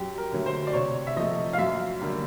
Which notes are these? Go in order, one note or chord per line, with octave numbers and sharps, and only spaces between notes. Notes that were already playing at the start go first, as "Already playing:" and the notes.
Already playing: F#2 G4
A#4
D3 F#3 A3
C5
D5
C3 C#5
E5
F3 A3 D#5
F5
F#2 E5
D3 G3 A#3